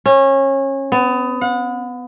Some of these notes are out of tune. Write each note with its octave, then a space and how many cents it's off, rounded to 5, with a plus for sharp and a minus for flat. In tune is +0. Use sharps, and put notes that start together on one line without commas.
C#4 -25
B3 +25
F#5 -30